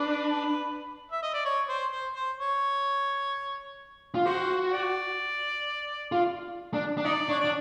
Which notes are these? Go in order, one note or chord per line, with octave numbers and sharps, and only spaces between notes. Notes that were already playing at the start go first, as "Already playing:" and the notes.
Already playing: D4 B4
E5
D#5
D5
C#5
C5
C5
C5
C#5
F4
F#4 C5
D5
F4
D4
D4
D#4 D5
D4 C#5
D4 D5